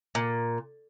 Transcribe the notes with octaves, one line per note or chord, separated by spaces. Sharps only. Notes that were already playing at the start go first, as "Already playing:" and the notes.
A#2